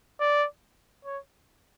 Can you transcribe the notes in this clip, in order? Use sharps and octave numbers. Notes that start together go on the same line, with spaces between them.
D5
C#5